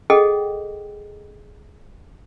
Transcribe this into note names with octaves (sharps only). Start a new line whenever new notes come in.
G#4 A4 D#5 F#5 G5